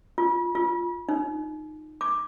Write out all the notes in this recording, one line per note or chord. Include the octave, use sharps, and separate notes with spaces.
F4
F4
D#4
D6